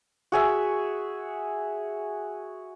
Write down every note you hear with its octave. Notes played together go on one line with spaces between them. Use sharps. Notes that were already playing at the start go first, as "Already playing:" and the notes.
F#4 G#4 E5